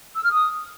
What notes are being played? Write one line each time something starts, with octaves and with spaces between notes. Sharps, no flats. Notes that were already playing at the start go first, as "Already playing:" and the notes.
E6
F6
D#6